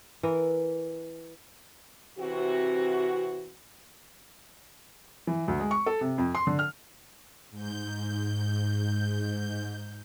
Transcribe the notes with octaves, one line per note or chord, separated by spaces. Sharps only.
E3 A#4
C3 E3 C4 F#4
E3
D2
G#3
C#6
A4
C3
F2
C6
D3
F6
G#2 G6